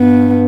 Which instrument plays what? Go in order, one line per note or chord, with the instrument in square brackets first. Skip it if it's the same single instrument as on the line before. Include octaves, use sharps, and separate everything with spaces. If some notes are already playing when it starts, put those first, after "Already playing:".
Already playing: [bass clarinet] G2 [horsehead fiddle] B3